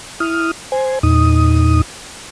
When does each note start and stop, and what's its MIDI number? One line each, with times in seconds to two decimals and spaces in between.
0.20 0.51 64
0.20 0.51 87
0.20 0.51 89
0.72 0.99 72
0.72 0.99 80
1.03 1.82 40
1.03 1.82 46
1.03 1.82 63
1.03 1.82 87